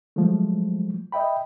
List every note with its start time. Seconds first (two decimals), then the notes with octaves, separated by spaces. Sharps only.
0.16 F3 F#3 G#3 A3
1.12 D#5 E5 G5 B5